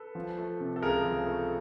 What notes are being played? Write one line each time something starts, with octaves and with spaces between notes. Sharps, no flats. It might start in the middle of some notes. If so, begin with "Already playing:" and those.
Already playing: A4 B4
F3
A3
C3
A4
C#2 G#4 A#4
F3
A3